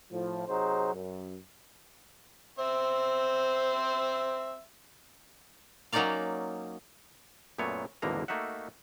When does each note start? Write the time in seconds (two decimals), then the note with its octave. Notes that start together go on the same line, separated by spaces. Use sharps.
0.11 A2 F3
0.48 C3 F#3 D#4 G#4 C5
0.94 F#2
2.59 C4 C5 E5
5.93 F#3 A#3 C#4 D#4 D5 F5
7.58 F#2 A#2 A3 B3 C#5
8.02 G#1 E2 B2 D3 A#3 A#5
8.28 A3 A#3 D#4 F#4 E5 F#5